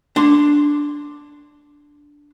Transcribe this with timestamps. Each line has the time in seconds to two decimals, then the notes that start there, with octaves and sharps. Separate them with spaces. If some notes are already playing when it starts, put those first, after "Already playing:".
0.16 D4 C6